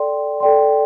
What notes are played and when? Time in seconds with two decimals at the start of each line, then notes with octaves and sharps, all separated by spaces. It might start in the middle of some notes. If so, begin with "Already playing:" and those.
Already playing: A4 D5 G5 C6
0.40 A4 D5 G5 C6